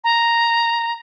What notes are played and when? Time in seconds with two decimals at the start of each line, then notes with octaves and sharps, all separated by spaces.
0.04 A#5